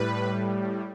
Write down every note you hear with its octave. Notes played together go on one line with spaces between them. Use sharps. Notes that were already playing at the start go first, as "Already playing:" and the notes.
Already playing: A2 G3 B4